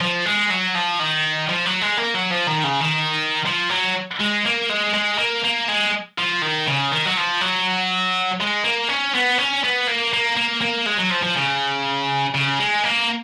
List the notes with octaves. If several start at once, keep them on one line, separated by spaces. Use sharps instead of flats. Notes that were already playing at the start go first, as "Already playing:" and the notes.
F3
G#3
F#3
F3
D#3
F3
F#3
G#3
A#3
F#3
F3
D#3
C#3
D#3
F3
F#3
G#3
A#3
G#3
G#3
A#3
A#3
G#3
F3
D#3
C#3
D#3
F#3
F3
F#3
G#3
A#3
C#4
B3
C#4
B3
A#3
A#3
A#3
A#3
G#3
F#3
F3
F3
C#3
C#3
G#3
A#3